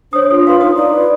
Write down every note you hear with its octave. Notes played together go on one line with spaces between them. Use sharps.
D4 C5 C#5 D#6
F4 A4
B4 F5 C6
D#4 D#6
D#4 D5
B4